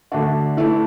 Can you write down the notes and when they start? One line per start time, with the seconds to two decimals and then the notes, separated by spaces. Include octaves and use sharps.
0.12 D3 A3 D4 F#4
0.57 E3 A3 E4